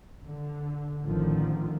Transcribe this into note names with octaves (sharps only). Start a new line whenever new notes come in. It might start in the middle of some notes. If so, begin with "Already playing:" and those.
D3
A1 D3 D#3 F3